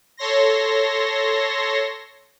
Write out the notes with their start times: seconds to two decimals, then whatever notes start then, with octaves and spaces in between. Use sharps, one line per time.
0.17 A4 C#5 C6 A#6